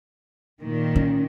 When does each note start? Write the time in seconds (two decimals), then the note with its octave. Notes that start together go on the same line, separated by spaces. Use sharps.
0.62 A#2 D#3
0.96 C#4